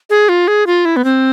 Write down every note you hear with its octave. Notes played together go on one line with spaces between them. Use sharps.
G#4
F4
G#4
F4
E4
B3
C4